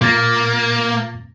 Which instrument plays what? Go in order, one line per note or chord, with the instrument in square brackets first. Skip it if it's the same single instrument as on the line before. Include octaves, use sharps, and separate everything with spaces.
[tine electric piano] A#2 A6 A#6 [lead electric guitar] A#3